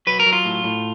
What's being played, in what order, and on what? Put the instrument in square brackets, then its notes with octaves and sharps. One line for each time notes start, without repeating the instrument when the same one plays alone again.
[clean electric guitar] F#3 B4
A#4
F#3
F4
A2
A2